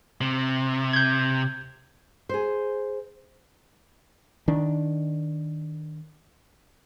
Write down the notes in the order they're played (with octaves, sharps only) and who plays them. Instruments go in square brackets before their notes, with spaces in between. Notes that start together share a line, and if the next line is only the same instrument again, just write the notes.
[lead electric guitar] C3
[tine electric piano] G6 G#6
[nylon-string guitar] G#4 C5
[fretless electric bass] D#3 D4